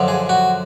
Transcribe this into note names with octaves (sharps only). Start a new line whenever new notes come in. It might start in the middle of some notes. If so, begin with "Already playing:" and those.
Already playing: F#2 D3 F3
G#4
F#4